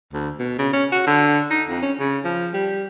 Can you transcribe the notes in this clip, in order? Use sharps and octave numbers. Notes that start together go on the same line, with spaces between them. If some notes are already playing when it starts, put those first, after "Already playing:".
D2
B2
C#3
C#4
F#4
D3
D#4
F2
C#4
C#3
F3
G3